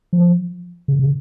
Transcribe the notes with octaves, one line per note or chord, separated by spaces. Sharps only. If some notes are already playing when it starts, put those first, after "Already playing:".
F3
C#3
C#3